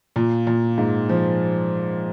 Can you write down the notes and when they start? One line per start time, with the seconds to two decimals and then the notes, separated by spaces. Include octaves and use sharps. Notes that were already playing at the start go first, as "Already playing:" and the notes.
0.16 A#2
0.47 A#2
0.78 G#2
1.09 F3